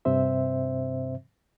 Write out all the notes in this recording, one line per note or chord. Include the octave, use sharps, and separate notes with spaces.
G2 C3 C4 C5 E5